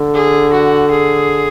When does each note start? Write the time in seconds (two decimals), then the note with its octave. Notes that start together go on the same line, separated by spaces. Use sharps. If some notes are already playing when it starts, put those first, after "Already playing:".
Already playing: D3
0.15 G#4
0.53 F#4
0.91 G#4